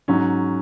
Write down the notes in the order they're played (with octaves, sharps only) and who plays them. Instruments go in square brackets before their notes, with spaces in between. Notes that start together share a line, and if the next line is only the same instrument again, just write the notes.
[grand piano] G#2 F#3 C#4